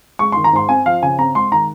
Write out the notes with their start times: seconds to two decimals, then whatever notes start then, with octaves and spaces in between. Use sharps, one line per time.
0.19 G#3 C#6
0.32 D#3 C6
0.44 A#5
0.53 G#2 C6
0.69 C4 G#5
0.86 F3 F5
1.03 C#3 G#5
1.19 C4 A#5
1.35 G#3 C6
1.52 D#3 A#5